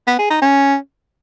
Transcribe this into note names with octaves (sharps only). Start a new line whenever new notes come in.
B3
G#4
D#4
C#4